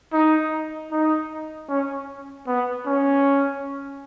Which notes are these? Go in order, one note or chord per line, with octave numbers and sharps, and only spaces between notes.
D#4
D#4
C#4
B3
C#4